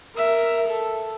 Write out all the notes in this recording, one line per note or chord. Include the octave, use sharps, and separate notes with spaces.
A#4 E5
A4